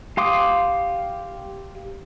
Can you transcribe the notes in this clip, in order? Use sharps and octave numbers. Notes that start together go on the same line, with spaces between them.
G4 F5 C6 D6 D#6